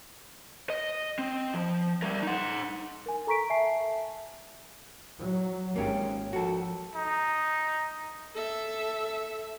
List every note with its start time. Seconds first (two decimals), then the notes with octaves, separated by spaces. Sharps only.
0.70 D#5
1.19 C4
1.54 F3
2.02 G3 A#4
2.23 D#4 F#5
3.06 A#4 G#5
3.27 A4 A#5 C#6 B6 D7
3.50 E5 G#5 A5 C7
5.19 F#3
5.76 G#1 G#2 A#3 C#4 G4
6.33 F3 F#4 A4
6.95 D#4
8.35 A4 E5